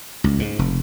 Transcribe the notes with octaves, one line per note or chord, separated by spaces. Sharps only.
C#2
G#2
F1